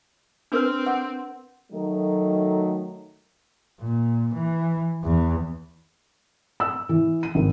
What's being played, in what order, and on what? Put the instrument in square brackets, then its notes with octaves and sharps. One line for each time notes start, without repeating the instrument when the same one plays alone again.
[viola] C4 [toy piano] D4 A#4 B4
[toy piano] F#5
[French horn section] D#3 F#3 A3
[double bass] A#2
E3
E2
[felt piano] E6
E3
D#7
G#1